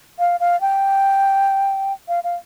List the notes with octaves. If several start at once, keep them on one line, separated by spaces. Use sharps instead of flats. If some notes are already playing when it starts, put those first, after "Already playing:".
F5
F5
G5
F5
F5